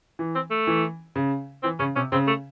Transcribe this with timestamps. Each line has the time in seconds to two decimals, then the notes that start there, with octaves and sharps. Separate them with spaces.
0.19 E3
0.35 C4
0.51 A3
0.67 E3
1.16 C#3
1.63 E3 C4
1.79 C#3 C#4
1.96 C3 C#4
2.12 C#3 C4
2.27 A3